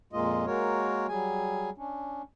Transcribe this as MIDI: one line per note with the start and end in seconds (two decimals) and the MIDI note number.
0.13 0.45 41
0.13 0.45 46
0.13 0.45 56
0.13 0.45 58
0.13 0.45 65
0.13 0.45 75
0.46 1.07 56
0.46 1.07 58
0.46 1.07 66
0.46 1.07 70
0.46 1.07 73
1.09 1.70 54
1.09 1.70 55
1.09 1.70 68
1.09 1.70 80
1.78 2.22 61
1.78 2.22 62